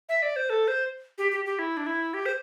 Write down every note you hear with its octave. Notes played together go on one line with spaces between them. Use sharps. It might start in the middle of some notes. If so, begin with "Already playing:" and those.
E5
D5
C5
A4
C5
G4
G4
G4
E4
D4
E4
G4
C5